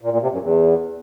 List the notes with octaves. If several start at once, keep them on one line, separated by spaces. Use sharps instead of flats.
A#2
A#2
C3
F#2
E2